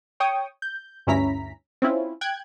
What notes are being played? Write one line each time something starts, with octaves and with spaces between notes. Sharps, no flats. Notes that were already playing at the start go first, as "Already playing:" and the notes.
C#5 G5 C#6 D#6
G6
D2 G2 C#4 E4 A#5 B6
C4 C#4 E4 F4
G5 F#6 G#6